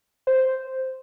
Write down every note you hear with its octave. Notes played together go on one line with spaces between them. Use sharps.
C5